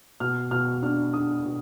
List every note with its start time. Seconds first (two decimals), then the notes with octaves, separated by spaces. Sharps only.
0.20 B2 F6
0.51 B2 F6
0.82 D4 F6
1.13 D4 D#6
1.45 B2